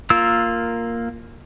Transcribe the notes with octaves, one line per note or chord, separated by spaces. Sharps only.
A#3 F4 A#4 E6